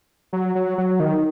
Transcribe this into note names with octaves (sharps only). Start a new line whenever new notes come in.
F#3
F#3
F#3
D#3